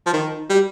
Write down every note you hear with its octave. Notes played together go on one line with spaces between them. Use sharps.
F3
D#3
G3